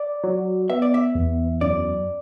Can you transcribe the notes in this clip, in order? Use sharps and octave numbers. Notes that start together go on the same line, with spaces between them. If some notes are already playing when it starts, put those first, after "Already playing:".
Already playing: D5
F#3
B3 E5
D5
E5
E2
F#2 D5